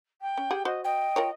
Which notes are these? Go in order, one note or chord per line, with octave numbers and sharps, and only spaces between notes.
G5
C#4
G4 G#4 F#5
F#4 C5 D#5
D#5 G5
F4 A#4 C#5